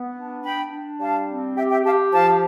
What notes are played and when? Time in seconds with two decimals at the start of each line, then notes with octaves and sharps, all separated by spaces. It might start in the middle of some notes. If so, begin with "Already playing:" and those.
Already playing: B3
0.15 D4
0.43 D4 G5 B5
0.71 D4
0.99 G3 F5 A5
1.28 C4
1.56 G4 E5 G5
1.70 E5 G5
1.84 G4 F5 A5
2.12 F3 F5 A5